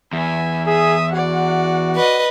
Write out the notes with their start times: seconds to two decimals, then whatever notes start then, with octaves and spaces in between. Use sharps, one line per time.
0.13 E2 E5 G#5
0.67 G#4 E5 D#6
1.13 F#4 D5 F#5
1.96 B4 D#5